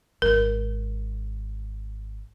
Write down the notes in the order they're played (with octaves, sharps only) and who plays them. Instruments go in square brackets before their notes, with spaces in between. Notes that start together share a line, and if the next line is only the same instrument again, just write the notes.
[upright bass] G#1 [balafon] A#4